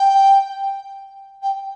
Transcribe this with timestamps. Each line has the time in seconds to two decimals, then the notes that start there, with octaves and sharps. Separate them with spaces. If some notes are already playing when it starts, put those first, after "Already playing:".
Already playing: G5
1.42 G5